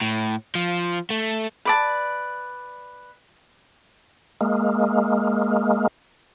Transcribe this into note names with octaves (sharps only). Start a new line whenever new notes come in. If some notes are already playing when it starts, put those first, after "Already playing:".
A2
F3
A3
B4 D5 A5
G#3 A#3